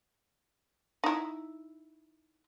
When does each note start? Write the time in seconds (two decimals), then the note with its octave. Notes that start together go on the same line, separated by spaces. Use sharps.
1.04 D#4 E4